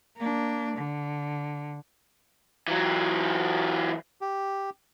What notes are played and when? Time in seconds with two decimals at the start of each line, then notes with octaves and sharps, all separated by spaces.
0.17 A#3 D4
0.77 D3
2.68 E3 F#3
4.21 G4